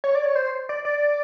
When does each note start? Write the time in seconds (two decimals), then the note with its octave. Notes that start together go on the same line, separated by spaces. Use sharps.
0.04 C#5
0.15 D5
0.26 C#5
0.35 C5
0.69 D5
0.85 D5